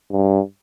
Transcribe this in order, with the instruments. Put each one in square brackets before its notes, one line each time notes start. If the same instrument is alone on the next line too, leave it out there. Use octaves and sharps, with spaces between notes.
[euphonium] G2